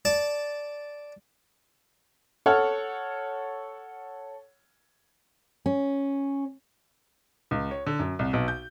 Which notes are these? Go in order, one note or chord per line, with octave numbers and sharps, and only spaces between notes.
D5 A5
A4 C#5 F#5 F6
C#4
C#2
C#5
D3
F#2
C2
B1
G6